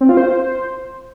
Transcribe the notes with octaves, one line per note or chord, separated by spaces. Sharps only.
C4
F4
C5